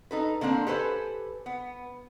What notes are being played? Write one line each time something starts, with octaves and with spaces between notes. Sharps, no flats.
D#4 A4 B4
D3 A#3 C4 D4
G4 A4 B4 C5 G#5
B3